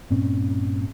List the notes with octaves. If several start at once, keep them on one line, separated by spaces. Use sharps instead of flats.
G2 A#2 C4 C#4